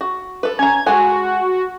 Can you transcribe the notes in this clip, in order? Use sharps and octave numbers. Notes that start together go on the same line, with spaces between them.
F#4
A4 B4
C#4 A#5 G#6
G#3 F#4 A4 G#5